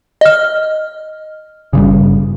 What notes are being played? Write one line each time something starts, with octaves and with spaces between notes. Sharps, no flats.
D#5 F6
G1 G2 C#3